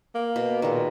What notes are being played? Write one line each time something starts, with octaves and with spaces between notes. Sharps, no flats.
A#3
B2
A#2 D#3 G#3